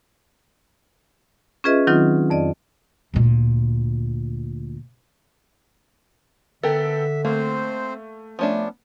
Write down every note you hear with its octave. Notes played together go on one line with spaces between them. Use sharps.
C#4 F4 G#4 B4 D#5 E5
D#3 F#3 C4 D#4 F4
F2 D5 D#5
D2 A#2
D3 B3 A4 A#4 E5 G5
A3 A#3 C4 C5
F3 A3 B3 C#4 D4